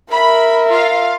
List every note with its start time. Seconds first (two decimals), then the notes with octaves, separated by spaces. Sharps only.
0.13 A#4 E5 B5
0.70 F4 F5